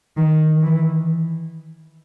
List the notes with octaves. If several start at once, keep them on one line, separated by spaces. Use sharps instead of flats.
D#3
E3